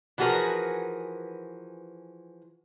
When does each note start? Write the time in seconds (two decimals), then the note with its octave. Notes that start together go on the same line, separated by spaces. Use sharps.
0.18 E3 F3 F#4 G#4 A#4 B4